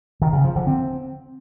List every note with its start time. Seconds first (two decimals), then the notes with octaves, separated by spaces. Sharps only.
0.22 D#3
0.33 C#3
0.44 F3
0.56 D3
0.67 C4